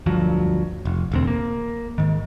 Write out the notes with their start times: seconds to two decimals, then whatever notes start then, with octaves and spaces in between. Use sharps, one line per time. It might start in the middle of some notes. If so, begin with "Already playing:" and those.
0.06 D2 G2 F3 F#3
0.85 F1
1.12 E1 D2 C4
1.27 A#3
1.98 G#2 D#3